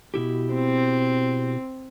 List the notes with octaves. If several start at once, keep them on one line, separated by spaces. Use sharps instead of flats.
B2 E4 G4
C4